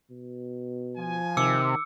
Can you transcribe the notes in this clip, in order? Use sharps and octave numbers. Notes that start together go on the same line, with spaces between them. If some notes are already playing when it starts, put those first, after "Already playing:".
B2
F3 G#5
C3 D#3 D6 E6 C#7